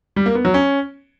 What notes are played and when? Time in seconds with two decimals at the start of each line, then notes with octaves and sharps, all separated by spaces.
0.16 G3
0.26 A#3
0.35 B3
0.45 F#3
0.54 C#4